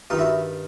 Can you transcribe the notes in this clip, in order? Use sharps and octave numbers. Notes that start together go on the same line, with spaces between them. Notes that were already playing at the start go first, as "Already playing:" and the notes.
G2 D#3 D#4 F4
E4 F#4